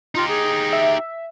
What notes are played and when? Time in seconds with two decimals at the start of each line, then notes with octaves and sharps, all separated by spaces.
0.15 D#4 F4 G4
0.28 G#4
0.73 E5